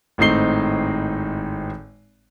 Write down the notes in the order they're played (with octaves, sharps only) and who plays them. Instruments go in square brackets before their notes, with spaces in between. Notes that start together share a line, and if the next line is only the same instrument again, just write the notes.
[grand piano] G#1 A2 C4 D#4 C7 G7